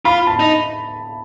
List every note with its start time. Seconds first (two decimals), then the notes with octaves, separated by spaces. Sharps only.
0.05 F4 B5
0.27 A5
0.39 D#4